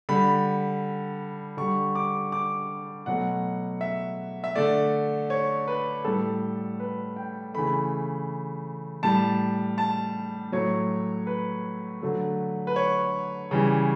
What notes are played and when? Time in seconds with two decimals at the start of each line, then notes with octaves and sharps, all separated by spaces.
0.09 D3 G3 B5
1.57 D3 G3 C#6
1.95 D6
2.32 D6
3.06 B2 F#3 A3 F#5
3.81 E5
4.44 E5
4.55 D3 A3 D5
5.30 C#5
5.68 B4
6.04 A2 G3 A4
6.80 B4
7.16 G5
7.54 C#3 E3 A3 B5
9.03 A2 G3 A5
9.78 A5
10.52 A2 F#3 A3 C#5
11.27 B4
12.02 D3 F#3 A3
12.67 B4
12.76 C#5
13.51 C#3 E3 G3